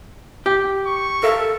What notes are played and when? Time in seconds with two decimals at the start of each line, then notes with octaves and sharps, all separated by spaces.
0.46 G4
0.87 C#6
1.23 A4 A#4 E5 F5